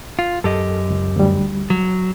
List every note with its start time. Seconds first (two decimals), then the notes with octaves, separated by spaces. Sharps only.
0.19 F4
0.44 F#2 G4 A4 D#5
0.90 C#2
1.16 D2 G3
1.70 F#3